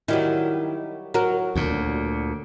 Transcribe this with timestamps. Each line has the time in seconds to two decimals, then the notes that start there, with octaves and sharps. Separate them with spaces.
0.08 D#3 F#3 G3 E4
1.14 F#3 F#4 A#4
1.55 D2 A#2